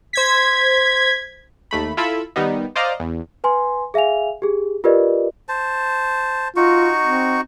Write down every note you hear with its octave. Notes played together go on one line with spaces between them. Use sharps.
C5 G#6 B6
D#2 A3 B5
E4 F4 A4 E5 B5 E6
D#3 G3 B3 D#4
C5 D5 D#5 F5 A#5
E2
B4 G#5 C6
G#4 E5 F5 G#5 F7
G4 G#4
F4 G4 A#4 B4 D5 D#5
C5 A5
D#4 F4 F#4 C#6
C4